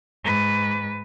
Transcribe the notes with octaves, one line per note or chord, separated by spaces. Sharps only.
G#2 B4